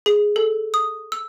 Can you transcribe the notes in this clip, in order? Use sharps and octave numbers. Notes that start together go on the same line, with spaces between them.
G#4
A4
D#6
E6